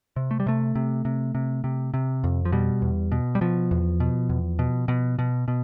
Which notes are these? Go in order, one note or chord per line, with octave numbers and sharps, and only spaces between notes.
C3
A3
G3
C3 A3
C3
C3
C3
C3
C3
F2
F3
B2 G3
E2
B2
G3
B2 F3
E2
B2
E2
B2
B2
B2
B2